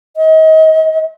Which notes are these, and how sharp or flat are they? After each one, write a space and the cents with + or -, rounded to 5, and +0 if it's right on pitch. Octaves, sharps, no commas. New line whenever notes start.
D#5 +35